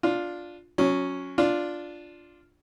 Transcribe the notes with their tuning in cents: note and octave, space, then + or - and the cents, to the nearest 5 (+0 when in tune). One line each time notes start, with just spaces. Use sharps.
D4 +0 F4 +5
F#3 -20 C#4 +0
D4 +0 F4 +0